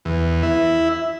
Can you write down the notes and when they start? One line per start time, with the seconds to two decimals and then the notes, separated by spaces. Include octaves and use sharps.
0.05 E2
0.43 E4